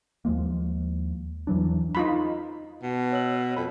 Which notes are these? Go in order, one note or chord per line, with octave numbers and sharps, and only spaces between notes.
D#2 F3 G#3 A#3
E2 E3 F#3 D4
D#4 F4 B5
B2
C#5 E6 F#7
F2 B5